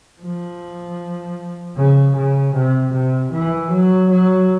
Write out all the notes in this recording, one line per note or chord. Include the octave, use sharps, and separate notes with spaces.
F3
C#3
C#3
C3
C3
E3
F#3
F#3